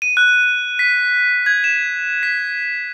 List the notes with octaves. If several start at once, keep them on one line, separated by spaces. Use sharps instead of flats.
D#7
F#6
B6
G#6
E7
B6